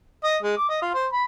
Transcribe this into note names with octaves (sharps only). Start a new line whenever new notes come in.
D#5
G#3
D6
D#5
F4
C5
B5